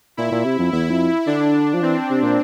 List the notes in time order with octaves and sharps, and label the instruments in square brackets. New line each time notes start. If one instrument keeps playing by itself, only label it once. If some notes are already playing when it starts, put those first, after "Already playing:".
[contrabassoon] A#2 [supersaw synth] E4
[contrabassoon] A#2
C3
F2
[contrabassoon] E2 [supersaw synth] E4
[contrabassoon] F2
[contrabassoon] D3 [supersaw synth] D4
[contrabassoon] F3
[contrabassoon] E3 [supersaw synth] C4
[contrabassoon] C3
A#2